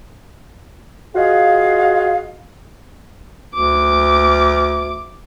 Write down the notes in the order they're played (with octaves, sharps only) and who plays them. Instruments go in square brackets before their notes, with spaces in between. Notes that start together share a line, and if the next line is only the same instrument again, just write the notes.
[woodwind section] F4 F#4 G#4 D#5 F5
[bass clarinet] D2 [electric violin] D6